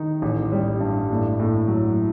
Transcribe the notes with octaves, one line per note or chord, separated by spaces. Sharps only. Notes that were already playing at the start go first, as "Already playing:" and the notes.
Already playing: D#3 D#4
A1
G3
G2
A2
A2
F#3